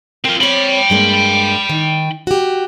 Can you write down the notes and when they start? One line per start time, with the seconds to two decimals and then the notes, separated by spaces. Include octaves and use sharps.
0.25 C4 F4 A#4
0.40 C4 C#5 G5 B5
0.90 G2 G#3 A#3
1.69 D#3
2.27 F#4 G4